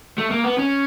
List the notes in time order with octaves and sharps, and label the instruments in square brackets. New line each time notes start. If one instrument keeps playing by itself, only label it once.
[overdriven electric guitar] A3
A#3
B3
C#4